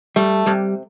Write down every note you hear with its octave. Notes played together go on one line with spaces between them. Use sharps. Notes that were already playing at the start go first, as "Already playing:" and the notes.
G3 A3
C3 G3